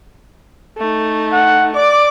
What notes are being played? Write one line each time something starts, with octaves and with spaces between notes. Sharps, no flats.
A3 D#4
F#5
D5 D6